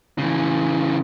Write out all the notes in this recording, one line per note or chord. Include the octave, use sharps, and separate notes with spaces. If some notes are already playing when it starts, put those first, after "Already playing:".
C#3 E3